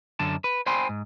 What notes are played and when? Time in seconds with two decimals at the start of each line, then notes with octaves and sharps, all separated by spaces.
0.19 F#2 D3 A5
0.44 B4
0.66 C5 G5 G#5 B5 C6
0.89 G#2